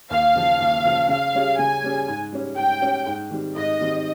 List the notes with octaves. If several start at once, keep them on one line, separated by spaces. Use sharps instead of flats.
D#2 F5
C#3 F3
D#2
C#3 F3
C#3 F5
G3 C#4 G#4
C#3 G#5
G3 C#4 G#4
G#2
G3 C#4
G#2 G5
G3 C#4
G#2
D#3 G3 C4
G#2 D#5
D#3 G3 C4